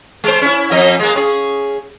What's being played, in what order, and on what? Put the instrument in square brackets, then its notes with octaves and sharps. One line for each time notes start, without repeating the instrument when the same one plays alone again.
[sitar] G#3 C5
C#4 E4
F2 F3 D#5
G#3 A#3
C#4 G#4